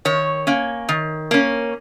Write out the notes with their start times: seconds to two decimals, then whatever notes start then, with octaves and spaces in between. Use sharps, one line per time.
0.05 D#3 C#5
0.47 A#3 C#4
0.89 D#3
1.31 A#3 C#4